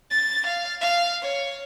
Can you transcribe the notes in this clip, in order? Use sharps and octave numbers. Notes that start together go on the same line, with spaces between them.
A6
F5
F5
C#5